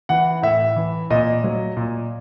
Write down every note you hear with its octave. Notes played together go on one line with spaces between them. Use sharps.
E3 F#5
A2 E5
E3
A#2 D#5
F#3
A#2